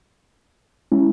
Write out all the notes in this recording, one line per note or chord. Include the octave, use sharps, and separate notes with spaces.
G#3 C#4 E4